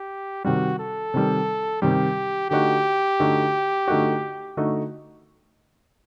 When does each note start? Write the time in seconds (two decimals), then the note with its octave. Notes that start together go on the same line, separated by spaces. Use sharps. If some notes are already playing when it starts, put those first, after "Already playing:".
Already playing: G4
0.45 C3 D#3 G3 F#4
0.79 A4
1.14 C3 D#3 G3
1.82 C3 D#3 G3 G4
2.50 D3 A3 D#4 F#4 G4
3.20 D3 A3 D#4 F#4
3.88 D3 A3 D#4 F#4
4.57 D3 A3 D#4 F#4